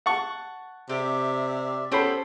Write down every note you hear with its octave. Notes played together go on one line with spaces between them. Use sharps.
F#5 A5 C#6
C3 G4 D5 E5
B3 C#4 G4 A4 C5 C#5 G5 B5